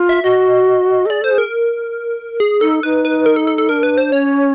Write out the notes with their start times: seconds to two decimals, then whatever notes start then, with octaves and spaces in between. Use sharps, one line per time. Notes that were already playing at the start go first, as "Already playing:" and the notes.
Already playing: F4
0.09 E5
0.23 F#4 D#5
1.05 A4
1.10 G#4 D5
1.21 A4 C5
1.31 G#4
1.38 A#4
2.40 G#4
2.61 D#4 A4
2.83 D#4 B4
3.05 B4
3.26 A#4
3.36 A4
3.47 A4
3.58 A4
3.69 D4 A#4
3.83 B4
3.98 C5
4.12 C#4 C#5